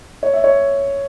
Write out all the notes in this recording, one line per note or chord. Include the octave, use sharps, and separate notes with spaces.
C#5
E5
C#5